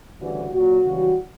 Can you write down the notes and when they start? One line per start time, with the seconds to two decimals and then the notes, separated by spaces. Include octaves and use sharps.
0.20 D2 C#3 E3 G3 F#4
0.53 A#2 F#3 F#4
0.85 C#2 C#3 E3 G3